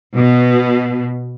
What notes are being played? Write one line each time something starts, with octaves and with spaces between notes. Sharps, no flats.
B2